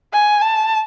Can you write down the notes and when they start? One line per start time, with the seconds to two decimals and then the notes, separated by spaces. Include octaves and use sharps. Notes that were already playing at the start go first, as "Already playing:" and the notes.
0.13 G#5
0.42 A5